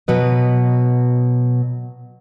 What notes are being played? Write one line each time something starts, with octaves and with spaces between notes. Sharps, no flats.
B2 F#3 B4 D#5